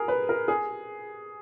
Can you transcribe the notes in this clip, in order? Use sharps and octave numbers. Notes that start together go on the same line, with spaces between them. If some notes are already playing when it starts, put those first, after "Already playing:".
Already playing: G#4 A#4
B4
A#4
G#4